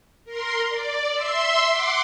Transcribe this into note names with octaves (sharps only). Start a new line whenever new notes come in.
A#4 C6
D5
E5 C6 E6
F#5 C6 D6